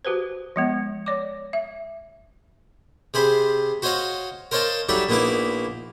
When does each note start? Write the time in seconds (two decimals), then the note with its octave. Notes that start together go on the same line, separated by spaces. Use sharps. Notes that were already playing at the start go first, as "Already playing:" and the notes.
0.05 F#4 G4 B4 C5
0.56 F3 G#3 B3
1.06 C#5 D5 D6
1.53 E5
3.14 C3 G#4 C5 B5
3.82 F#4 C5 C#5 D#5 F5 F#5
4.51 A#4 C5 C#5 D#5 F5 A5
4.89 F#3 G3 D4 D#4 A4 E5
5.09 A#1 A#3 B3 D#4 E4 D6